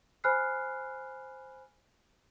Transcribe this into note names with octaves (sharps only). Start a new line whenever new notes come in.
C5 G#5 B5 F6 F#6 C7